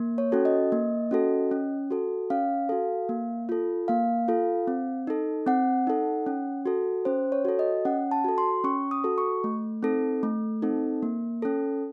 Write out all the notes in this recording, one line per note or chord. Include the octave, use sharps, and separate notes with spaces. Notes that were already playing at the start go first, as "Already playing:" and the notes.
Already playing: A#3
C#5
C#4 F#4 A4
D#5
A#3
C#4 F#4 A4
C#4
F#4 A4
C#4 F5
F#4 A4
A#3
F4 A4
A#3 F5
F4 A4
C4
D#4 A4
C4 F#5
D#4 A4
C#4
F#4 A4
C#4 C5
C#5
F#4 A4
D#5
C#4 F#5
A5
F#4 A4
C6
C#4 C#6
D#6
F#4 A4
C#6
A3
C4 D#4 A4
A3
C4 D#4 A4
A#3
C#4 A4